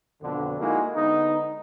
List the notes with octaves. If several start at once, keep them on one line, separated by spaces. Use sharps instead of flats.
F2 B2 D3
G#3 A#3 D#4 E4 F#4
D3 G#3 B3 D#4